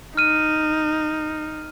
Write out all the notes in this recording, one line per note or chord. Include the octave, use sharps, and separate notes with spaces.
D#4 F6 D#7